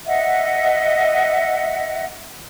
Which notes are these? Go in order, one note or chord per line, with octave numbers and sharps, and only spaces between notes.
D#5 E5 F#5